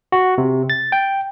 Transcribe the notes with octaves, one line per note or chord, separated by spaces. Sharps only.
F#4
C3
A6
G5